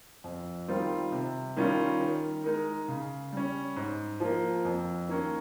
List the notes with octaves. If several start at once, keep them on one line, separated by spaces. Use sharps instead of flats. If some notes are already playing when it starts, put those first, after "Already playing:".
F2
D#3 G3 C4 F4
C3
D#3 G3 C#4 F4
D#3
G#3 D#4 A#4
C#3
G3 C#4
G#2
F3 A#3
F2
D#3 A#3 C#4